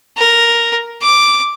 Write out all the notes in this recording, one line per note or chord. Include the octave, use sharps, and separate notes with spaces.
A#4
D6